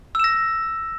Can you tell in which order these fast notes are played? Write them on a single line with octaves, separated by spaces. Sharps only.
E6 E7 A#6